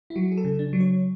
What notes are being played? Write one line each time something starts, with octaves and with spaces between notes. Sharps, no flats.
E4
F#3 F#4
G#4
A4
C#3
D4
F#3
C#5